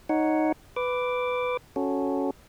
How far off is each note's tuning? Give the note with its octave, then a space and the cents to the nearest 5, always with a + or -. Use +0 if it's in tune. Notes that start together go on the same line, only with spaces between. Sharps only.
D#4 +0 C#5 +0 F#5 +0
B4 +10 D6 +0
C#4 +0 F#4 -5 A4 +0